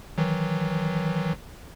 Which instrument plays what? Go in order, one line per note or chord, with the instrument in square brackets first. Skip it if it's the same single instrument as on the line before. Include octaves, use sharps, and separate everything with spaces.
[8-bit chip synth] D#3 E3 F#3